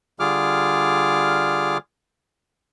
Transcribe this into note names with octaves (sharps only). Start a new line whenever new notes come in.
D3 G3 F4 G#4 D6 F6